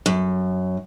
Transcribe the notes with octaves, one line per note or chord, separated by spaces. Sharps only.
F#2